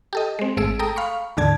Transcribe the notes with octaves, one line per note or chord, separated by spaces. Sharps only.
G4 A4 D#5
G#3 C4
G#1 A3 G#4 E6 D7
A4 G5 A#5 D#6
F5 B5 C#6
D#2 G#2 D3 D5 A5 G#6